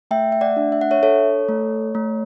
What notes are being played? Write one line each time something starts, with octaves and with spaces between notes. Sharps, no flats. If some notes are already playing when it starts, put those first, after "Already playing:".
A3 E5 G5
E5
D5 F#5
D4
E5
F#5
C#5 E5
A4 C#5
A3
A3